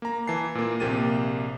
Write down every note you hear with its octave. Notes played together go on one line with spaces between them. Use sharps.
A#3 A#5
E3 A5 C7
A#2 A#3
A#1 C3 A#3 G4 A6 D#7